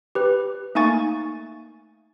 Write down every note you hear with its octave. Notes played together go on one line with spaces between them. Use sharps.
G4 B4
A3 A#3 D#4 G#5 C#6 A6